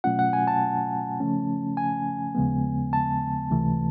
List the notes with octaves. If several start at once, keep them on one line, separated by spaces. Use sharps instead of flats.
B2 F#3 A3 C#4 F4 F#5
F#5
G#5
A5
C#3 F3 A3 C#4
G#5
D#2 C#3 F3 G#3 B3
A5
C#2 C3 E3 A3